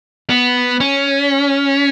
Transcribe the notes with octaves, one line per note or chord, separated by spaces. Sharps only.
B3
C#4